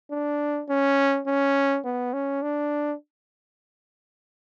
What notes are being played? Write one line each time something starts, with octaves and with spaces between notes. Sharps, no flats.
D4
C#4
C#4
B3
C#4
D4